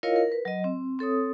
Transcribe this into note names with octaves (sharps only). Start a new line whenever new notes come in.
E4 F4 A#4 C#5 D#5 F5
A#4
B4
F#3 D#5
C4
C4 A4 C#5 D#6